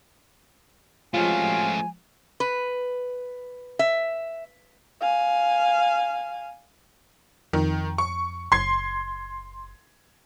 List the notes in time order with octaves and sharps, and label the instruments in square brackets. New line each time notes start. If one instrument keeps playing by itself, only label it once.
[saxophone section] C3 F#3 F4 [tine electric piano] F3 G#3 [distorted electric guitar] A3 C#4 [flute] G#5
[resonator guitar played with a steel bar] B4
E5
[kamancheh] F5 G#5
[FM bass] F2 [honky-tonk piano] D#3
[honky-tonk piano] C#6
[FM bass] F#1 [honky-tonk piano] C6 G#6 C7